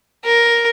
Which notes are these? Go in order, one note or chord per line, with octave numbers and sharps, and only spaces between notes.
A#4